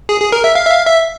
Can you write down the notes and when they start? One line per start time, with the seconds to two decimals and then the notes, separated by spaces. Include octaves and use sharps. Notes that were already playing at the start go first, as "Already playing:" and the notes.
0.09 G#4
0.21 G#4
0.32 A#4
0.44 E5
0.55 F5
0.65 E5
0.71 F5
0.87 E5